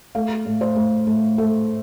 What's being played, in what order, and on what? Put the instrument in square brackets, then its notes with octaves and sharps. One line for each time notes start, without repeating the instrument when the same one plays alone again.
[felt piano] A3 F5
A2
C5
A2
A2
A3